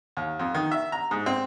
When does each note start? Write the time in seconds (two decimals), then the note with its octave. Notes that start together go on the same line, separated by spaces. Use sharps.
0.17 D#2
0.39 F2
0.54 D#3
0.71 E5
0.92 A#5
1.11 G#2
1.26 C4